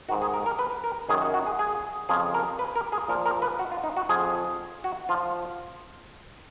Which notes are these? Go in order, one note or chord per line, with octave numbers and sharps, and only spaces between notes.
G#2 D#3 F#4
G#4
A#4
A#4
B4
A#4
F#2 D#3 G#4
F#4
F#4
G#4
G#4
F2 C#3 F3 G#4
A#4
B4
A#4
G#4
A#2 F3 A#4
A#4
B4
F#4
F4
D#4
F#4
F2 F3 G#4
F#4
F3 F4